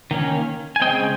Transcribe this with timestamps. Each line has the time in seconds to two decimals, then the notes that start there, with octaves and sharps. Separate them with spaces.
0.11 D#3 A#3 C#4
0.76 G#5
0.81 C#3 G#3 C4 D#5 G5